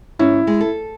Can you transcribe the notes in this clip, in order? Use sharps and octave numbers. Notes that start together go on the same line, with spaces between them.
G#2 C#4 E4
G#3
A4